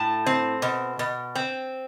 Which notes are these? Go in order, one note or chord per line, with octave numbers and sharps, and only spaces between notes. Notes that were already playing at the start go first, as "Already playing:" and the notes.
Already playing: A2 A5
C4
B2
B2
C4